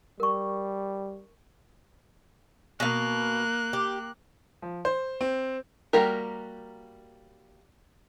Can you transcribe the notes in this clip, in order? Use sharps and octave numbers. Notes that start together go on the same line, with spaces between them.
G3 A#4 C#6
B2 A#3 F5 F#6
G4
F3
C5
C4
G3 A#3 F#4 G4 A#4